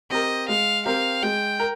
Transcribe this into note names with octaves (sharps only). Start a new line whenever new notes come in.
C4 G4 A#4 D#5
G#3 F5
C4 G4 A#4 F5
G#3 G5
A#4